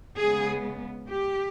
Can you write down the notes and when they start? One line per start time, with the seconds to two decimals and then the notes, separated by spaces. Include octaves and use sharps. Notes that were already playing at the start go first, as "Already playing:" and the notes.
0.16 C#3 G#3 B3 G#4
1.08 G4